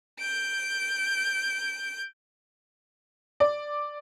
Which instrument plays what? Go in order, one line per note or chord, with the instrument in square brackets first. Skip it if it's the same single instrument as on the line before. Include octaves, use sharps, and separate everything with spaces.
[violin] G6 D7
[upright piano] D5